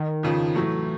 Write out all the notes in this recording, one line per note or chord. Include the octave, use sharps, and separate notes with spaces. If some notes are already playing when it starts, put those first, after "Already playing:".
Already playing: D#3
F2 C#3 F3
A2 E3 F#3 A3